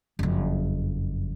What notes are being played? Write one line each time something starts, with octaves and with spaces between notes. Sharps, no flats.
F#1 F2